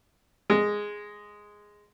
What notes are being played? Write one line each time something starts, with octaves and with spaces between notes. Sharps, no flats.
G#3